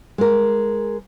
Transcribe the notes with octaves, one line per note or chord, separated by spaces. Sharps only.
G#3 A#4